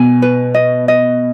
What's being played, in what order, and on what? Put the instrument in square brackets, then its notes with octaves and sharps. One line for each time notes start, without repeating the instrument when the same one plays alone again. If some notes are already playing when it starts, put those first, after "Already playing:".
Already playing: [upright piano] B2 [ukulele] G#5
[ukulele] B4
D#5
D#5